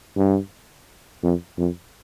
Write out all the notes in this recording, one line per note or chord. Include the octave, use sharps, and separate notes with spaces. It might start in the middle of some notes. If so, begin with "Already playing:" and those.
G2
F2
F2